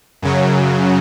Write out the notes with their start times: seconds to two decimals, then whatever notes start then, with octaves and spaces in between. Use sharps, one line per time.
0.22 F#2 C#3 F#3